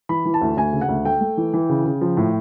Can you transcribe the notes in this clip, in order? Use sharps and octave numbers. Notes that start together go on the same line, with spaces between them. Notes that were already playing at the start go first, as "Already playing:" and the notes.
E3 B5
E3
A5
D2
D2 G#5
C#3
F#5
D2
A3 G5
A3
E3
E3
C#3
C#3
F3
A2